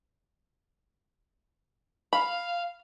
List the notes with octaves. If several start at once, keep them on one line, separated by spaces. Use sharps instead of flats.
F5 B5